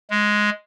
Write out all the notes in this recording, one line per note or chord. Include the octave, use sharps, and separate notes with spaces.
G#3